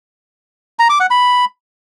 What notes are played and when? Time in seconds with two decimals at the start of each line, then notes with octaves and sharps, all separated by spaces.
0.79 A#5
0.90 D6
1.00 F#5
1.10 B5